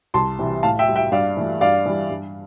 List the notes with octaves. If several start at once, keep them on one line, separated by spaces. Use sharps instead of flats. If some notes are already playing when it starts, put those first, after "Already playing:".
C2 A5 C6
C3 E3 G3
A2 F5 A5
E5 G5
G3
E5 G5
G2 D5 F5
E3 A3
G2 D5 F5
E3 G3
G2